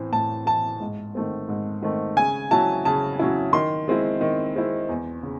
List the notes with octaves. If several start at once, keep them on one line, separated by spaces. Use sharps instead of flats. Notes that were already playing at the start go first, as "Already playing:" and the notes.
Already playing: A2 E3 C4
A2 A5
E3 C4 A5
G#2
D#3 A3 C4
G#2
D#3 A3 C4
C#3 G#5
F#3 C#4 E4 A5
C#3 A5
F#3 C#4 E4
D#3 C6
G#3 C4 E4
D#3
G#3 C4 E4
E2
C#3